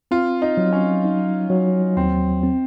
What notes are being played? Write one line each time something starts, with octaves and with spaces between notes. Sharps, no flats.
C4 F4
D#4
F#3
C#4
D#4
F#3
D#2 C4
C4